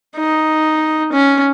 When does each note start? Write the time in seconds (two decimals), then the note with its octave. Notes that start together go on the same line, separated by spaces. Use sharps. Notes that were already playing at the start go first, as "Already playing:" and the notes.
0.17 D#4
1.12 C#4